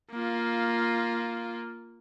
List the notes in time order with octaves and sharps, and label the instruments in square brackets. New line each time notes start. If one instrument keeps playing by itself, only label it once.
[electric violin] A#3 F4